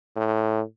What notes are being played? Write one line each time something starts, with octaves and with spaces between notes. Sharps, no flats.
A2